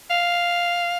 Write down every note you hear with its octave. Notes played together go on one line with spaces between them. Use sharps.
F5